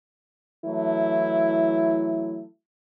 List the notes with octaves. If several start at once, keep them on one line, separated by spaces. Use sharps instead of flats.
E3 F#3 A3 E4